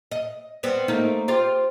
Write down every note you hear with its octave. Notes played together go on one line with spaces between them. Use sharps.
D#5
G3 B3 C4
A3 A#3 D#4
F4 G4 C5